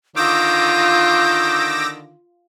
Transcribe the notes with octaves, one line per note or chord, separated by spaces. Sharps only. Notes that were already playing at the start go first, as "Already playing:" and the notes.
D3 D#3 F4 D6 E6 G6 A#6